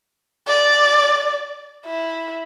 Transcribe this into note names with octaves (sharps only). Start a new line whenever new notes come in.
D5
E4